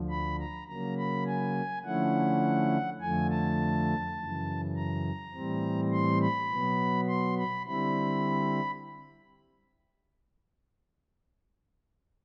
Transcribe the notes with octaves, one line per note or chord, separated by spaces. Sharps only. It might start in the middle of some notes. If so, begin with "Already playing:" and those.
Already playing: D2 D3 F3
B5
A#5
C#3 F#3 A#3 A#5
B5
G#5
D3 F3 A3 C#4 E4 F#5
F2 D3 F3 A3 G#5
A5
F#2 C#3 E3
A#5
A2 E3 G3 C4
C6
B5
B2 F#3 B3
C6
B5
D3 G3 C4 E4 B5